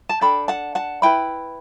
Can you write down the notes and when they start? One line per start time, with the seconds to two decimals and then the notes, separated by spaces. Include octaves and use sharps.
0.09 A5
0.21 D4 A4 G5 B5
0.48 F#5 A5
0.75 F#5 A5
1.02 E4 B4 G5 B5